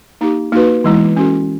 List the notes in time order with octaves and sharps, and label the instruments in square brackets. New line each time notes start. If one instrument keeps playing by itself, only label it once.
[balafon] A#3 D#4 G4
A#3 D#4 F#4 B4
E3 G#3 B3 E4
C#4 F#4 A4